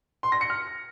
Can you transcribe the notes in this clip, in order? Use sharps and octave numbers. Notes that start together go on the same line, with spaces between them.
C6
A#6
C#7
F6